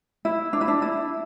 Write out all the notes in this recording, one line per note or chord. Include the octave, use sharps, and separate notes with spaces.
E4
D4
E4
D4
E4